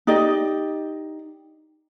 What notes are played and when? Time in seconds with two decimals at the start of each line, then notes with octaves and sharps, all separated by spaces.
0.07 D#4 G4 D5 D#5